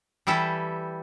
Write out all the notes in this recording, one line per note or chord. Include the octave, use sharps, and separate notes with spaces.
E3 G3 E4 G4 A4